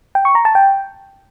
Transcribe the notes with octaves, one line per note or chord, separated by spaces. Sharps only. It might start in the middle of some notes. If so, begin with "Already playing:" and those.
G5
C#6
A#5
A5
G5